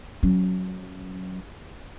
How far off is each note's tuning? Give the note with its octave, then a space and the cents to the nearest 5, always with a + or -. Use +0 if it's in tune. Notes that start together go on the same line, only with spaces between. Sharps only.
F#3 +0 C#4 +0